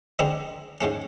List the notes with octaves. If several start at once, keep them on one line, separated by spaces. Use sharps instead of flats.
D3 G#3 B3 C4 D4 D#4
G#2 G#3 A3 C#4